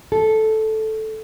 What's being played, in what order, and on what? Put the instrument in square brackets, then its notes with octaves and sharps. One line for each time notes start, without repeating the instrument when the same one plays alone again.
[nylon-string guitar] A4